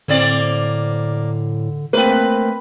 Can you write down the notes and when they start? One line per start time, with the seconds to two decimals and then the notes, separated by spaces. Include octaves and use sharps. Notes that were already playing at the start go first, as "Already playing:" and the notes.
0.08 A2 D3 A#3 C4 D5
1.93 A3 A#3 C4 B4